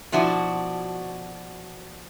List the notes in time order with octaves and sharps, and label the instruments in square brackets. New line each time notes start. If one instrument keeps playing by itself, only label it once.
[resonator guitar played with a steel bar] B2 F3 D4 E4 F#4